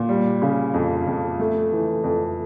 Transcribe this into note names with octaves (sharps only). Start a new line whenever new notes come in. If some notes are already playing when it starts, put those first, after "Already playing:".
Already playing: A#2
G3
C#3
F2
F2
A3
E3
F2